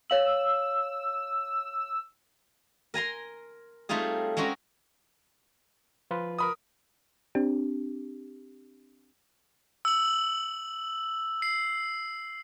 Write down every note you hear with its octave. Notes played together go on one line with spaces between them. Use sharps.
C#5 F5 E6 F#7
A#4 G#5 A#5 C6
G3 A3 C4 D#4 F4 G#4
G#3 C4 C#4 F#4 A#4
F3 F4 B4
A#4 B5 D#6
C4 D4 G4
E6 F#7
C7